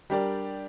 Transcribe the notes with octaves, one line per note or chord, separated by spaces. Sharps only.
G3 D4 G4 A#4 D5